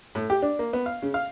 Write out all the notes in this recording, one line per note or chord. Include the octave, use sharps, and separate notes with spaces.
A2
G4
D4
A#3
B3
F5
C#3
F5